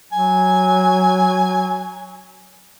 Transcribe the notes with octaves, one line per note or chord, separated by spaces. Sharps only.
F#3 G#5